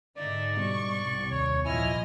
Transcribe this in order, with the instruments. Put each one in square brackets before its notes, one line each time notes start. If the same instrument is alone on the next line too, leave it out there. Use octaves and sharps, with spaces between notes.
[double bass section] G#2 D3 [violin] D#4 E5 [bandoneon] D5
[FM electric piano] B2 G3 [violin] C#6
[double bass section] C2
[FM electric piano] D#2 [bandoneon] C#5
[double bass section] A#2 F3 [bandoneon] E4 G#5 [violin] D#5 F6